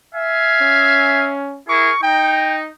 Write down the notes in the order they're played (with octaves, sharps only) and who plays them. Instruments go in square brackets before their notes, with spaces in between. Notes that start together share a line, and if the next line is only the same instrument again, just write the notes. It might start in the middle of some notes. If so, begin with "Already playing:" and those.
[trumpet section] E5 F5 G#5
[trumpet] C#4
[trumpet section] E4 G#4 A#4 [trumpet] C#6
[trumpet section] D#4 [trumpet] G5